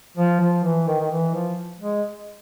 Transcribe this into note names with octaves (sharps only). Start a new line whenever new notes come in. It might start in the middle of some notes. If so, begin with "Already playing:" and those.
F3
F3
E3
D#3
D#3
E3
F3
G#3